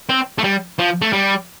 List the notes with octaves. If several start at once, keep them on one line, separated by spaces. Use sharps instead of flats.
C4
A3
G3
F3
A3
G3